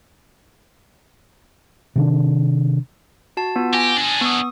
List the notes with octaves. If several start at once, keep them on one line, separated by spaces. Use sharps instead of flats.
C3 D#3 D4
F#4 A5
B3 F4
G4 G#5 A#6
D4 G#4
B3 D#6